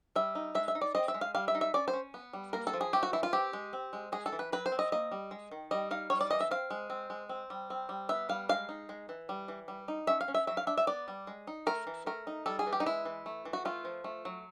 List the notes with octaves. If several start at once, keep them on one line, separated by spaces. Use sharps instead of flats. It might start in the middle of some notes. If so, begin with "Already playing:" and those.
G3 E5
D#4
G#3 E5
E5
D#4
D5
C4 D#5
E5
G#3
F5
G3 F5
E5
D#4
E5
C#4 D5
C5
C#4
B3
G3
A#3 A#4
A4
F3
G#4
A3 G4
F#4
E3 E4
F4
C4 G4
G#3
C4
G#3
G#3 G#4
A4
E3
B4
F#3 B4
C5
C4
D#5
A#3 D#5
G3
G#3
D#3
G3 D#5
D#4 F5
G3 C#5
D5
E3 D#5
E5
C4 F5
G#3
C4
G#3
C4
G3
C4
G3
B3 E5
G3 F5
G#3 F5
D#4
G#3
E3
G3
E3
G3
D#4
C#4 E5
F5
C#4
E5
F#3 E5
F5
D4 E5
E5
B3 D5
G3
G#3
D#4
A3 A#4
E3
A3 A#4
D#4
G3 A4
G#4
E3
G4
D#4
G#3 E4
E3
A3
E3
F#4
A3 F4
F3
A3
F#3